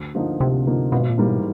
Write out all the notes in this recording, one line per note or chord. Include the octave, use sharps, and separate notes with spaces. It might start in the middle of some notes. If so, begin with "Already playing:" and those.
Already playing: D2
D3 F3 A#3 D#4
D2 C3
D3 F3 A#3 D#4
G#1 B2
A#2
G#2 E3 G3 A#3
B2